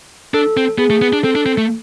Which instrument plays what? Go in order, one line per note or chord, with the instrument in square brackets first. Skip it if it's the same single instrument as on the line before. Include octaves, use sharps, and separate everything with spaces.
[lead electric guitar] D4 [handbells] A4
[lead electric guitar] C4
[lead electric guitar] B3 [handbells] G#4
[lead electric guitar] A3
B3
D4
[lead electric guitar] C4 [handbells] A4
[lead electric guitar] D4
C4
A3